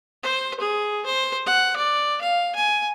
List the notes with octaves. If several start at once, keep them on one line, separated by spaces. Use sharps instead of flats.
C5
G#4
C5
F#5
D5
F5
G#5